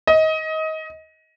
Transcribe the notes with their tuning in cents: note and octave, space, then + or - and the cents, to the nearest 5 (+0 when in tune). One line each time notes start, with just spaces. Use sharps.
D#5 +25